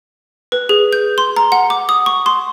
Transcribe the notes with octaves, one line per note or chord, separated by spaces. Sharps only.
B4
G#4
G6
C6
A#5
F#5
D6
D#6
C#6
C6